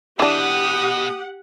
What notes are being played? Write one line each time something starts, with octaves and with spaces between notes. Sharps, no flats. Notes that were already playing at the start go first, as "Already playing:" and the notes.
B2 E3 D4 G4 F#5 D#6